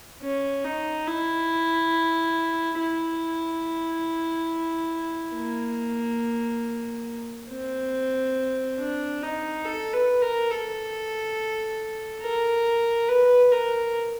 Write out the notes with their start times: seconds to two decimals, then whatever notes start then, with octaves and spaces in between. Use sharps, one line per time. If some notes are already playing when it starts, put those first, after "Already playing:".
0.22 C#4
0.64 D#4
1.07 E4
2.79 E4
5.36 A#3
7.51 C4
8.80 D4
9.23 D#4
9.65 A4
9.93 B4
10.22 A#4
10.51 A4
12.23 A#4
13.09 B4
13.52 A#4